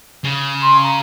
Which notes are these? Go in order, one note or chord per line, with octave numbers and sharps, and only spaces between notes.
C#3
C6
A#5